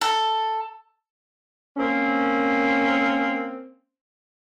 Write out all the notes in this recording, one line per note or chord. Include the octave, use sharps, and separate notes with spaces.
A4
A#3 C4 C#4